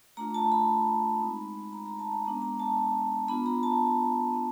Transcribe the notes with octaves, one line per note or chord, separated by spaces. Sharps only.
A3 D4 F4 A#5
A5
B5
G#3 C4 D#4
A#5
A#5
A5
A#5
G#3 B3 D4 A#5
A#5
A5
B3 D4 F4 B5
A#5
A5
B3 D4 F4